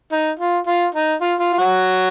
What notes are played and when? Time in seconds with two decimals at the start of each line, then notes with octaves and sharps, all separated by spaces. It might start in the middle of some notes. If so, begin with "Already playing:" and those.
0.12 D#4
0.39 F4
0.67 F4
0.95 D#4
1.21 F4
1.40 F4
1.53 F4
1.58 F#3 F#4